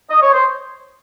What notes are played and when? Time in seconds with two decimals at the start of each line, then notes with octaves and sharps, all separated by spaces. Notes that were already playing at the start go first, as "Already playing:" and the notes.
0.10 D#5
0.22 C#5
0.33 C5